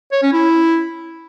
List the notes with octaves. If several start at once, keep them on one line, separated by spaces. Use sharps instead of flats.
C#5
C#4
E4